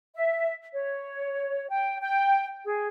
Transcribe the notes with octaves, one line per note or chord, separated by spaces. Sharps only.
E5
C#5
G5
G5
G#4